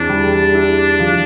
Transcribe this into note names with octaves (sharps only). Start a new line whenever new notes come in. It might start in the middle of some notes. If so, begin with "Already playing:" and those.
Already playing: E2 C4 D4
G3
E4
F3